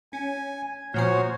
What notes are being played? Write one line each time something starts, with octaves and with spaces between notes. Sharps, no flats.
C#4 G#5
A#2 F3 F#4 C5 C#5